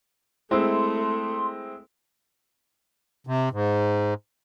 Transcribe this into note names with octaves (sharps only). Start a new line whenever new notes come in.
G#3 A3 C4 E4 C6
C3
G#2